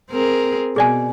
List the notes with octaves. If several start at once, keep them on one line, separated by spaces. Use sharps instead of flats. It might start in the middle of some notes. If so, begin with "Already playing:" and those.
C4 G#4 A#4
B2 G#4 D5 G#5